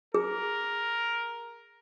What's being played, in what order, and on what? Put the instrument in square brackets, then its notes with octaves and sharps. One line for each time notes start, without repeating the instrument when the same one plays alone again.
[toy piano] G#4 [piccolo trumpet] A#4